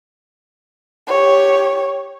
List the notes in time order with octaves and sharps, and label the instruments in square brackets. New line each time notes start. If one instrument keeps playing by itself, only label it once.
[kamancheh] G4 C#5